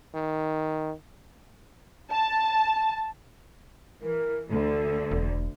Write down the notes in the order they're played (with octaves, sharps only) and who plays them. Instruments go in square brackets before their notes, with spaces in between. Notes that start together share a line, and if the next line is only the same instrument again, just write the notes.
[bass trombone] D#3
[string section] A5
[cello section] E3 [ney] A#4
[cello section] D2 D3 [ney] A4
[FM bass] E1